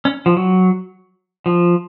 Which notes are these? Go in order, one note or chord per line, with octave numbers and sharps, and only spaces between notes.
C#4
F3
F#3
F3